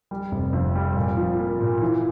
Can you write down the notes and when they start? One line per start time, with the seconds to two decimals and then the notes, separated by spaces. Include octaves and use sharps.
0.11 G3
0.32 F1
0.53 F2
0.75 G3
0.96 A#2
1.17 F3
1.39 A#3
1.60 A#2
1.81 E3